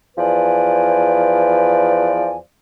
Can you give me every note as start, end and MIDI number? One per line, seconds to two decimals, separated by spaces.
0.17 2.35 40
0.17 2.35 53
0.17 2.35 71
0.17 2.35 74
0.17 2.35 80